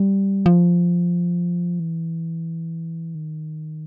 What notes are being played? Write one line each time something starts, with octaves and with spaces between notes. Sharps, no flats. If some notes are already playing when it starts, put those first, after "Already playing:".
Already playing: G3
F3
E3
D#3